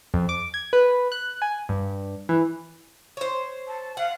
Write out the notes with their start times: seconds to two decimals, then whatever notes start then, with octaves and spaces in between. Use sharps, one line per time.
0.14 F2
0.29 D6
0.54 G#6
0.73 B4
1.12 F#6
1.42 G#5
1.69 G2
2.29 E3
3.17 C5 C#5
3.68 A5
3.97 F5 F#5